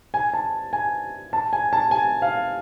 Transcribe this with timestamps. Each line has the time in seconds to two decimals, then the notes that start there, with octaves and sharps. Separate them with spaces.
0.14 G#5
0.34 A5
0.73 G#5
1.33 A5
1.53 G#5
1.73 A5
1.91 G#5
2.22 F5